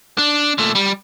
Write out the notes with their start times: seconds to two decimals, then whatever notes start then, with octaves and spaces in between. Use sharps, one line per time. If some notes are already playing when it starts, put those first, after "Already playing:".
0.18 D4
0.58 A#2 A3
0.75 G3